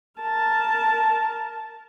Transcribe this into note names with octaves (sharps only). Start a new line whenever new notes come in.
A#4 A5